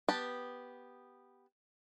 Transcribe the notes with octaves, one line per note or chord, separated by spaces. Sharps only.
B3 G4 A5